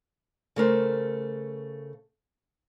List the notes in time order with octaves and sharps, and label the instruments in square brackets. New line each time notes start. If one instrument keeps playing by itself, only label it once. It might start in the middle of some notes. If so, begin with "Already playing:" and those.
[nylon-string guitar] C#3 A3 A#4 C5